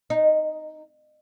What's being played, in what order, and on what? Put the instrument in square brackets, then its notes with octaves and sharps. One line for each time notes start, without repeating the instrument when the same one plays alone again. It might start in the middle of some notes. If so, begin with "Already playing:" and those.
[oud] D#4